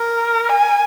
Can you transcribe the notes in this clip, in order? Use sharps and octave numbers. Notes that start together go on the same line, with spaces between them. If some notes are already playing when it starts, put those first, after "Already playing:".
Already playing: A#4
G#5